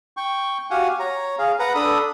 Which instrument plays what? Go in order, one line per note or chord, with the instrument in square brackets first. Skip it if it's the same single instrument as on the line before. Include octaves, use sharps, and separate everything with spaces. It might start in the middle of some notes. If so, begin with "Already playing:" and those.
[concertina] G5 C#6
F#4 G4 F5 F#5 G#5
C#5 A#5
G#4 F5
B4 F#5 A#5
D4 A4 B5 D#6